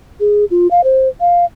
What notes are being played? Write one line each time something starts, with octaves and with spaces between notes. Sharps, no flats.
G#4
F4
F5
C5
F5